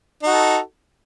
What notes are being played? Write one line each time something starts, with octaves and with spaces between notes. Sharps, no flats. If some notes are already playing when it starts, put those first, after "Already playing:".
D#4 F#4 A4